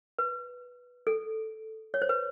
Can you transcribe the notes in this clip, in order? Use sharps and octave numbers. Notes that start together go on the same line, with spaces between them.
B4
A4
C#5
C5
B4